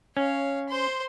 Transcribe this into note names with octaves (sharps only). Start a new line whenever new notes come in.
C#4 C#5 F5
C5 C6